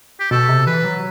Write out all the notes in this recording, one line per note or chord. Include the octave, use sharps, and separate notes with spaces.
G4
B2 A4
C3
E3 B4
F#3